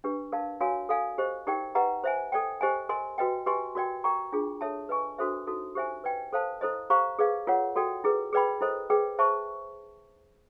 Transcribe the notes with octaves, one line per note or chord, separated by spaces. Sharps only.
D4 G4 B4
A#4 D5 F5 A5
F#4 A#4 C#5 F5 G#5
A4 D5 F5 G#5
G4 C5 D#5
D#4 G4 A#4 D5 G5
G4 B4 D#5 F#5 A#5
C5 E5 G#5
A4 D5 G5
G4 C5 D#5 G#5
A#4 D#5 G#5 C6
F#4 B4 D#5 G5
G4 B4 D#5 G#5 C6
F#4 A#4 D5 G5
A#4 D5 G5 A#5 C#6
D4 F4 G#4
A4 C#5 E5 A5
B4 D#5 G#5 C#6
D4 F#4 A4 C5 E5
D#4 F#4 A4
G4 C5 E5 G#5
B4 D5 G5
A4 C5 F5 A5
E4 A4 C5 D#5
G4 C5 F5 A#5 C#6
G#4 B4 D5 F5
F4 A#4 C#5 F#5
F#4 A4 D5 G5
E4 G#4 B4
G#4 B4 D5 G5 B5
E4 A4 C5 D#5
G#4 B4 D5 G5
C5 E5 A5 C#6